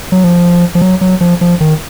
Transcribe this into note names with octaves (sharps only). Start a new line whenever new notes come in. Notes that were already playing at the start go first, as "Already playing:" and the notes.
F#3
F3
F3
F#3
F#3
F3
F3
D#3